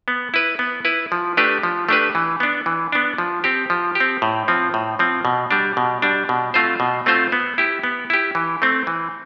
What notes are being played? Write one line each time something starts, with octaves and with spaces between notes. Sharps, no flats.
B3
E4 B4
B3
E4 B4
F3
A3 D4 G4 B4
F3
A3 D4 G4 B4
E3
B3 D4
E3
B3 D4
F3
C4 G4
F3
G4
C4
A2
F3 C4
A2
F3 C4
B2
G3 D4
B2
G3 D4
B2
A3 C4 F4 C5
B2
A3 C4 F4 C5
B3
E4 G4
B3
E4 G4
E3
A3 C4
E3